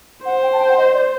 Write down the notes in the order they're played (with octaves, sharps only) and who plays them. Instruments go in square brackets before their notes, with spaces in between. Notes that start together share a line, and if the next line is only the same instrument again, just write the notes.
[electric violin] C5 [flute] F#5
[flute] G5
A5
G5
F#5
D#5
D5